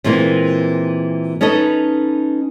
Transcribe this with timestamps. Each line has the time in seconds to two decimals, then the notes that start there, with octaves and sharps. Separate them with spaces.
0.04 A#2 E3 G#3 A#3 C4
1.41 C#4 D#4 A4 B4 D#5